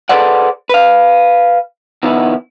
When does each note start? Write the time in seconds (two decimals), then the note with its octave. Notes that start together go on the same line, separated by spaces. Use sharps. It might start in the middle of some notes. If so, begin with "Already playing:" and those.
0.09 G#4 A4 B4 C5 D5 F#5
0.69 B4 F5
2.03 B2 D#3 F3 B3 E4